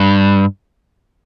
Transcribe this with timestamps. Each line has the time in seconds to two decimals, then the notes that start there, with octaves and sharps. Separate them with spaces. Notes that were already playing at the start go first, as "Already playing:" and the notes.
Already playing: G2